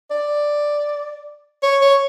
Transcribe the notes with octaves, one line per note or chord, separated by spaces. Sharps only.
D5
C#5
C#5